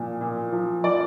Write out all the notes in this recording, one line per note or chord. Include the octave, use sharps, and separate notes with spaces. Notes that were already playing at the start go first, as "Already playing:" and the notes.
Already playing: A#2 F3
A#2
F3
F3 D5